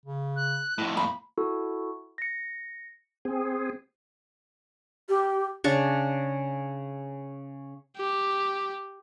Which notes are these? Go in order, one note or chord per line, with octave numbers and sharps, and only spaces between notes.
C#3
F#6
F2 A2 E4
A#3 B5
E4 F#4 A4
A#6 C#7
C4 G#4
G4
C#3 D4 C#6
G4